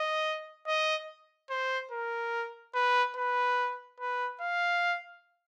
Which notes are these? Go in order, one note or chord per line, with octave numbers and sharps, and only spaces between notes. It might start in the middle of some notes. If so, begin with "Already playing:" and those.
Already playing: D#5
D#5
C5
A#4
B4
B4
B4
F5